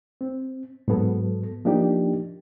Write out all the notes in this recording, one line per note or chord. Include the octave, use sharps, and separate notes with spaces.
C4
G#2 F#3 B3 A4
F3 A#3 D4 D#4 G4